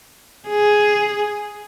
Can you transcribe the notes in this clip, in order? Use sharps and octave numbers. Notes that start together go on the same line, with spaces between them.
G#4